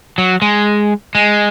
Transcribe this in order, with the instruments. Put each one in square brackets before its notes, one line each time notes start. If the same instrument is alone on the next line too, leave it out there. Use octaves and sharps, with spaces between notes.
[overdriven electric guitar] F#3
G#3
G#3